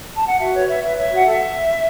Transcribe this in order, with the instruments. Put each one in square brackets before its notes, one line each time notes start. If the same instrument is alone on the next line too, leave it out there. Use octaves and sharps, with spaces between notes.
[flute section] A5
F#5
F#4 E5
B4 C#5
B4 E5
B4 E5
C#5 E5
F#4 F#5
A4 E5